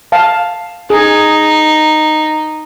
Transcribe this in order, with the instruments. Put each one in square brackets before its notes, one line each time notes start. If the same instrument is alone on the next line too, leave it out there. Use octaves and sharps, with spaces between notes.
[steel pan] F5 A5
[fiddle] D#4 [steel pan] G#4